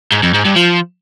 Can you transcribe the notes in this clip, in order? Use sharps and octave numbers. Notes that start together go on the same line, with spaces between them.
G#2
F2
G#2
G2
F3